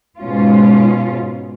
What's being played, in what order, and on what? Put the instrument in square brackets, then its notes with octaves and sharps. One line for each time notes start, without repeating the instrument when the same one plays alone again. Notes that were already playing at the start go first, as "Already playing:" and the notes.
[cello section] G#2 B2 C#4 F4